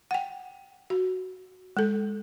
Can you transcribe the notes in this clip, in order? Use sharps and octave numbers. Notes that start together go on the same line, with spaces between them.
F#5 G5
F#4
G#3 A4